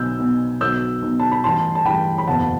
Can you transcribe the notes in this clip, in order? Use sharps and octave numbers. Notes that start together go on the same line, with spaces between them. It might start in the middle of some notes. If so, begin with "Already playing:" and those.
Already playing: B1 B2 E6 G6
B1 B2
B1 B2 E6 G6
B1 B2
A5
B5
A1 G2 E3 A5 C6
A5
A1 G2 E3 G5 B5
B5
F#1 E2 B2 F#5 A5